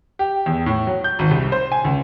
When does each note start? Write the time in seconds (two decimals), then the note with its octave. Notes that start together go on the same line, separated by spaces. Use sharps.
0.19 G4
0.46 E2
0.66 A2
0.87 F#3
1.04 G6
1.19 G#1
1.31 C2
1.52 C5
1.72 G#5
1.84 C#2